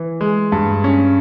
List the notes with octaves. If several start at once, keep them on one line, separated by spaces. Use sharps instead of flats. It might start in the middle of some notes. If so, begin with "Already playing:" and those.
Already playing: E3
G#3
G2
C#4